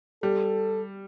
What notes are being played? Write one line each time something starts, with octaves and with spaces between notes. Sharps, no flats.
G3 A4